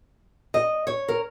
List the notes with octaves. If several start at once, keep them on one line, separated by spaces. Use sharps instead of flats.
D#5
C#5
A#4